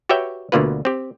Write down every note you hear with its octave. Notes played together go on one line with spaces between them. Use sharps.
F#4 G4 B4 C#5 E5 G5
D2 B2 D3 A#3 F4 B4
C4 G4